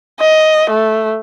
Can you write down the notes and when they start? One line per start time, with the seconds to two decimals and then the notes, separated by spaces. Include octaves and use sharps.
0.20 D#5
0.70 A3